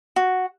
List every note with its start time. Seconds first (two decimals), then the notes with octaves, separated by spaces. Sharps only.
0.16 F#4